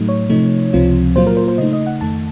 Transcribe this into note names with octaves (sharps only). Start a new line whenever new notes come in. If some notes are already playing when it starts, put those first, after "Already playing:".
Already playing: A2 F#3 A3 D#4
C#5
C3 F3 A3 D#4
C#2 C3 F3 C4 F4
A#2 F#3 A#3 F4 C5
A#4
C5
C5
C#3 A3 D#4 D#5
D#5
F#5
F2 D#3 A3 A5